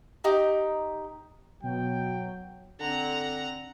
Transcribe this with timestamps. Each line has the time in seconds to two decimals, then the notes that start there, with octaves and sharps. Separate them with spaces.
0.24 D#4 G4
1.63 B2 F#3 G5
2.80 D3 C4 F#5 A#5